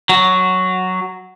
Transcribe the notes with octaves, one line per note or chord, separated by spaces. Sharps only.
F#3